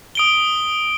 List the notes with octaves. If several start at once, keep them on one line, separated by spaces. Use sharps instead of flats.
D#6 D7 G7